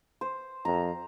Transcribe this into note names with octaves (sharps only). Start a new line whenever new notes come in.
C5
F2 A#5